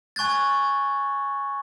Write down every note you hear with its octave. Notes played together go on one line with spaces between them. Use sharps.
G#5 C#6 F#6 G#6 A6